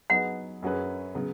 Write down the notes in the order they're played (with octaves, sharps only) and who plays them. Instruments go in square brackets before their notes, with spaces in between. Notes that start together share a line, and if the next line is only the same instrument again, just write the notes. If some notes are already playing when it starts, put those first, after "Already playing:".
[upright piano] F#3 B3 D#4 G#4 B4 [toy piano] F#5
[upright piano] F#2 F#3 C#4 G#4 B4
C#3 F#3 B3